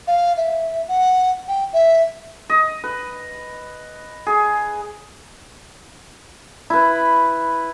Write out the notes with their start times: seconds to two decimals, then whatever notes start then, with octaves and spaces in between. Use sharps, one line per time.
0.07 F5
0.37 E5
0.88 F#5
1.48 G5
1.73 E5
2.50 D#5
2.84 B4
4.26 G#4
6.70 E4 B4